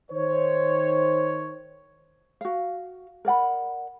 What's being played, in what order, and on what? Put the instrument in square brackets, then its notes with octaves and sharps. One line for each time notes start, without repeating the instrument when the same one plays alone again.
[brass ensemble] D#3 C5 C#5
[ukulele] F#4 F5
A#4 D5 F#5 B5